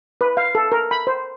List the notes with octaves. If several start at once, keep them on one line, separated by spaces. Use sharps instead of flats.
B4
F5
A4
A#4
B5
C5